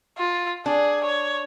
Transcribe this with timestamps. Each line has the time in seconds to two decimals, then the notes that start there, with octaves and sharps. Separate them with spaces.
0.18 F4
0.66 D4 G#4
1.04 C#5